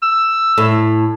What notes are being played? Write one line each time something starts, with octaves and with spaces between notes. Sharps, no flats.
E6
A2